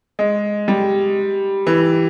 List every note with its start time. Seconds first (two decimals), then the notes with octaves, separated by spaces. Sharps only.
0.19 G#3
0.68 G3
1.67 E3